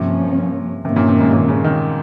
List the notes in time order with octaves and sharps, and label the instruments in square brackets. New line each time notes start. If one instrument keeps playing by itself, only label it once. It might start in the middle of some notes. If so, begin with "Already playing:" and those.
Already playing: [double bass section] G2 F3 A#3 C#4 [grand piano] C3
[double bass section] G2 D#3 A#3 C#4 [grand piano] C3
[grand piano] A#2
C3
G#2
A#2
C#3
D#3